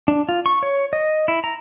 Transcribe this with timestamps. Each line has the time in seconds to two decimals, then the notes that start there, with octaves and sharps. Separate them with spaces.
0.08 D4
0.29 F4
0.46 C#6
0.63 C#5
0.93 D#5
1.28 E4
1.44 A#5